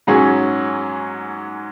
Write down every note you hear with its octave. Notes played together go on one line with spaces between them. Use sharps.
G#2 F#3 C#4 G#4